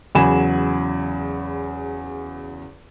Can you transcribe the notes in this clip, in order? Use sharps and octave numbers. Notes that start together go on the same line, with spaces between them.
E2 C#3 F#3 G#5 B5 E7